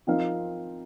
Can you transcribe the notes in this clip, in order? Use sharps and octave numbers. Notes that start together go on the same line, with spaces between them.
F3 C4 D#4 A#4 F5